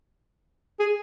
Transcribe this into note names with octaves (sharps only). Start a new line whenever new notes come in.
G#4